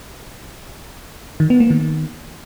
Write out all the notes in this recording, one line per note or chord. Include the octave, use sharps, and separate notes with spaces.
D#3
B3
A#3
D#3